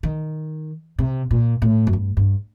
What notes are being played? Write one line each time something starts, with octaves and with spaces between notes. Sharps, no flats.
D#3
C3
A#2
A2
F#2
G2
G2